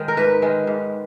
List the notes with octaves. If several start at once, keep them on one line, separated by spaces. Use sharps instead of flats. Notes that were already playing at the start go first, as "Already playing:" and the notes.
Already playing: D#3 G#3
A#4
G#2 B4
D#3 G#3
G#2